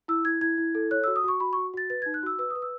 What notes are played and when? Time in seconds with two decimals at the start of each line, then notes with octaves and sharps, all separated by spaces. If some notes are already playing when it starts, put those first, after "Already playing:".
0.08 E4 E6
0.25 E4 G#6
0.41 E4 G#6
0.58 E4
0.75 A4
0.91 C#5 F#6
1.04 F#4 E6
1.16 D#6
1.24 F#4 C#6
1.40 F#4 B5
1.53 F#4 C#6
1.74 F#4 A6
1.90 B4 A6
2.02 D#4 G#6
2.14 F#6
2.23 F#4 E6
2.39 B4 E6
2.50 D#6
2.55 B4
2.62 E6